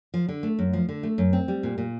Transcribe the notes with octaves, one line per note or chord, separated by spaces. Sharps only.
F3
D3
A3
F#2
F3
D3
A3
F#2
C4
G3
A#2
A#2